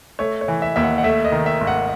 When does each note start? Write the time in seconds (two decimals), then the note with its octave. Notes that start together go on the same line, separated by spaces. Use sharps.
0.19 A3 C#5
0.41 C#5
0.48 E3
0.62 E5
0.76 D#2 E5
0.83 F#5
0.98 F#5
1.04 A3 E5
1.24 D#5
1.32 D#3
1.46 E5
1.61 G#1
1.67 F#5